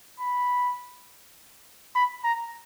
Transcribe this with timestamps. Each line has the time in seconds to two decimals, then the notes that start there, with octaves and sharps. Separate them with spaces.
0.20 B5
1.95 B5
2.24 A#5